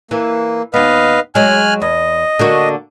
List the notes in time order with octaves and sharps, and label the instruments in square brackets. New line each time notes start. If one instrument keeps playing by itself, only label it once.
[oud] E3 [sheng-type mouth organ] A#3
[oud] D#2 B3 [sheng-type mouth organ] B4 D#5 F5
[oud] F#3 G#3 [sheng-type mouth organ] G#5 F6 F#6
[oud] E2 [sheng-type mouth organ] D#5
[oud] D3 A#3 F#4